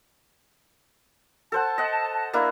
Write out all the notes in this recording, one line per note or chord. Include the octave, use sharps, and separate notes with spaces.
A4 C5 F#5 A5
D#5 F#5
A#3 D4 E4